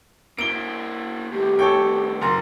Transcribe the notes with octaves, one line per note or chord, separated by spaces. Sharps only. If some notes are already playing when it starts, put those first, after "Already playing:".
A#3 E4 D7 G7
A2 D#3 G4
A4 C#5 G5
F#1 A#5 C6